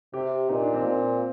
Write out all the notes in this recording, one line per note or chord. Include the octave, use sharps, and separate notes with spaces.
C3 G4
A#2 D#4
D4
C4
A#2